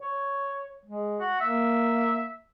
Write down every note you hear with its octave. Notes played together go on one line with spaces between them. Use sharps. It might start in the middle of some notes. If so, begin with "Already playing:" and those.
C#5
G#3
F#4
A#3 E5